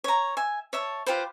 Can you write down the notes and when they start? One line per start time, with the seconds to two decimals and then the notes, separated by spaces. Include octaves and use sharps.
0.04 C#5 A#5
0.37 E5 G#5
0.73 C#5 E5 A5
1.07 F4 G4 B4 C5